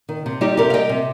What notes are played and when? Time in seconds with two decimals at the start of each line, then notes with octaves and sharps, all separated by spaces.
0.09 D#3
0.26 C3
0.41 G3 D#4 G4
0.57 C3 G4 A#4
0.70 F5
0.73 G3 D#5 G5
0.89 C3